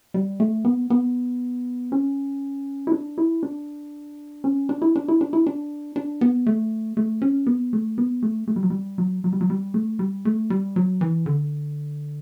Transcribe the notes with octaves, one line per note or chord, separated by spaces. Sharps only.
G3
A3
B3
B3
C#4
E4
D4
E4
D4
C#4
D4
E4
D4
E4
D4
E4
D4
D4
B3
A3
A3
C#4
B3
A3
B3
A3
A3
G3
F#3
G3
F#3
F#3
G3
F#3
G3
A3
G3
A3
G3
F#3
E3
D3